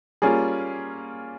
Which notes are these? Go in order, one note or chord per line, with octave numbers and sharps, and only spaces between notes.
G3 A#3 C#4 F4 G#4